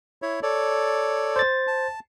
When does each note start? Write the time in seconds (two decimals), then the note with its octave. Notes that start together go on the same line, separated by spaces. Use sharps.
0.22 E4 C#5
0.43 A4 C#5 D5
1.36 C5 A6
1.67 A5